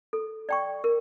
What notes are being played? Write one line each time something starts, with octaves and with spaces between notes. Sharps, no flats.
A4
D5 G5 C#6
A#4